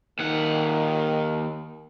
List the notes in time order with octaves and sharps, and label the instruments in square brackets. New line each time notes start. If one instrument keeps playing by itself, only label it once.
[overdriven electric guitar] D#2 F#5 [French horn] D#3